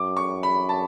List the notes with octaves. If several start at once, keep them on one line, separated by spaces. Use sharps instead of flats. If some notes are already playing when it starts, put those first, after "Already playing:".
Already playing: F#2 D6
C#6
B5
A5